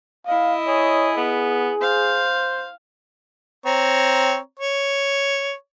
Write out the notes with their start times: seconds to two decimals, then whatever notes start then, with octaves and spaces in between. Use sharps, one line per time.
0.27 E4 D#5 F5
0.67 G#4 C#5
1.17 B3 G#4
1.81 C5 F5
3.66 C4 C#5 A#5
4.60 C#5